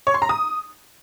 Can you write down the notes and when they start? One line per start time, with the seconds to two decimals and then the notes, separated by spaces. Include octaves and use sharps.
0.07 C#5
0.14 C6
0.22 A#5
0.29 D#6